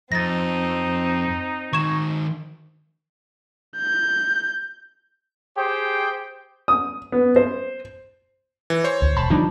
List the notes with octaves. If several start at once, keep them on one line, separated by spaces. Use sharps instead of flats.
F2 C4 D#4 A6 A#6
D#3 C5 C#6 G#6 E7
G6
G4 G#4 C5 G5
D#6
B3
C5
E3
C5 C#5
D2
E1 A5 B5
D3 E3 F3 G3 D4 D#4